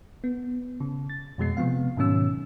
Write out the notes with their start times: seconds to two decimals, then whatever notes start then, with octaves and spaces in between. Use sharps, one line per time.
0.24 B3
0.80 C#3
1.09 A6
1.38 F2 B2 G#3 C7
1.57 C3 F3 B3 F5
1.97 G#2 B2 D#3 F#3 C#4 E6